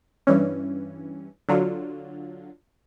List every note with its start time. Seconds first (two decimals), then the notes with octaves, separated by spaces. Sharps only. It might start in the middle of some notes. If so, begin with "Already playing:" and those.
0.27 G2 E3 C#4
1.49 D3 F#3 F4